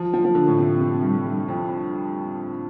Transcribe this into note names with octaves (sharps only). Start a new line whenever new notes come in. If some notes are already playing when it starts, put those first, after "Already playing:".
Already playing: F3
F3
F3
D3
A2
C3
C3
G2
G2
F2